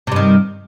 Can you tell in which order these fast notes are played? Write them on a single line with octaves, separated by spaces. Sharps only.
C3 G2 D#3